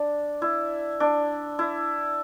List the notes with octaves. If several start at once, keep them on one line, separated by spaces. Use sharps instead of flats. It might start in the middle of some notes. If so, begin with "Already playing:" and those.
Already playing: D4
E4
D4
E4